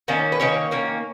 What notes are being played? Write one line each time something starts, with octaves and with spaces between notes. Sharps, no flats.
D#3 A#3 C#4
B4
D#3 A#3 C#4 C#5
D#3 A#3 C#4